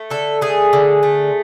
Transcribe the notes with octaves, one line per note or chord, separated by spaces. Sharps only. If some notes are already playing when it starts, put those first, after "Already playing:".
Already playing: A3
D3 A4
A3 G#4
D3
A3